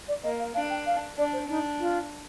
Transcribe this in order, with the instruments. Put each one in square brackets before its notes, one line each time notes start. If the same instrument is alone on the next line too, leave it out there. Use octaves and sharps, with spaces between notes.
[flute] D5
[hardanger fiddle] A#3 [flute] D#5
[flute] F5
[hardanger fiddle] D4 [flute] F5
[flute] G5
F5
[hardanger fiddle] D4 [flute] D5
[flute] C5
[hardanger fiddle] D4 [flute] D#4
[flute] F4